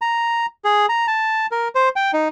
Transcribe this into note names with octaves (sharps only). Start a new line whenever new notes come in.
A#5
G#4
A#5
A5
A#4
C5
G5
D#4